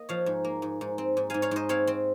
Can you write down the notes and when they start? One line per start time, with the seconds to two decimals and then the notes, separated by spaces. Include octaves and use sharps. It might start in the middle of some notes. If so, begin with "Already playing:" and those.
Already playing: A#3 D#5
0.09 F3 C#5 F5
0.26 G#2
0.44 A#3
0.62 G#2
0.81 G#2
0.98 C4
1.17 G#2
1.30 G#2 F5 G#5
1.42 C#5 F5
1.51 G#2 C5 D#5
1.69 C4 C#5 F5
1.87 C4